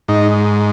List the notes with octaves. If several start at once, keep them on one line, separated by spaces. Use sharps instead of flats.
G#2 D#4